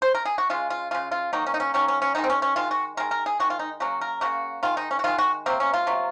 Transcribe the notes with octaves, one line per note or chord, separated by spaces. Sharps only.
C5
A#4
G#4
F#4
C#3 G#3 F4
F4
C#3 G#3 F4
F4
D#3 F#3 A#3 D#4
C#4
D#4
C#4
D#3 F#3 A#3 C#4
C#4
C#4
D#3 G#3 D#4
C4
C#4
C#4
D#3 G#3 F4
F#4
D#3 G#3 A#4
A#4
G#4
D#3 G#3 F#4
F4
D#4
C#3 F#3 A#3 F#4
A#4
C#3 F#3 A#3 F#4
D#3 G#3 F4
D#4
C#4
F#4
D#3 G#3 F4
F#4
C3 F#3 A#3 C4
C#4
F4
C3 F#3 A#3